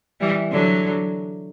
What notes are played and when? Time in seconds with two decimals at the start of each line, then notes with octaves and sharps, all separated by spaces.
0.21 E3 G3
0.52 D3 F#3